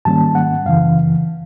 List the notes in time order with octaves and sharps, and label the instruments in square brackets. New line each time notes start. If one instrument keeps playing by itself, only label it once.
[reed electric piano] G#2 D#3 G3 A#3 C#4 A5
F#5
F#2 C#3 E3 F5